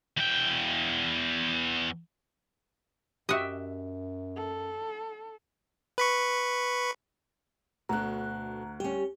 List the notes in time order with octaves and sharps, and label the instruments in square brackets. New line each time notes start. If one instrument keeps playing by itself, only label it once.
[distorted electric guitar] E2 G5
[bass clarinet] F#2 [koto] F#4 D#5 [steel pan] G4 E5
[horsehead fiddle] A4
[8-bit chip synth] B4 B5 C#6
[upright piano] D2 [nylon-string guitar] B2 D3 [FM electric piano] A#5 F#6
[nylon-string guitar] G3 C#4 [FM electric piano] G4